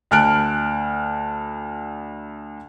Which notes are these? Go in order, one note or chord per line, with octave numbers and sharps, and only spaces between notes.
D2 A5 F6 F#6 D7